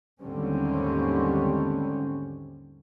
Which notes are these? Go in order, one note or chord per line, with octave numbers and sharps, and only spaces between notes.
D#2 G#2 D3 G3 C4 C#4